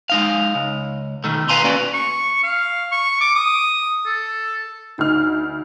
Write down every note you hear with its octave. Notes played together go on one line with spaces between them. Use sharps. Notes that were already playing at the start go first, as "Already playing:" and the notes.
G#3 D#4 F5
C#2
B2 D#3 A3
B4 F5 G#5 A#5 C6
A#3 C#4 F#4 B4 D5
C#6
F5
C#6
D6
D#6
A4
D2 D#4 F6